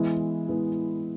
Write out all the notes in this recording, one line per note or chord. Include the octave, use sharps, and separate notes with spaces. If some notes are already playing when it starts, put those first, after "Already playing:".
Already playing: E3 G#3 B3 E4
E3 G#3 B3 E4